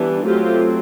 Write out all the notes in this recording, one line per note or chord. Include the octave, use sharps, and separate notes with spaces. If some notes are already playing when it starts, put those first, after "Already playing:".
Already playing: E3 G3 B3 D4
F#3 A3 C4 F4 G4